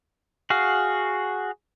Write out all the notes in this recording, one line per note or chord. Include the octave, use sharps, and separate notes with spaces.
F#4 G#4 F5